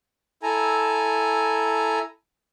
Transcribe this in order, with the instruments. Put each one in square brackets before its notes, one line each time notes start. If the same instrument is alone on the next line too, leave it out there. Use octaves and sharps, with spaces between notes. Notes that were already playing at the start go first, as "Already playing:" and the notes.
[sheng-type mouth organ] E4 A4 G#5 A#5